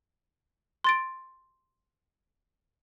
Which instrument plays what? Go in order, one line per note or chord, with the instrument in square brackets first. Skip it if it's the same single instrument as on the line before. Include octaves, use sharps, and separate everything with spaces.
[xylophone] C6 A6 D7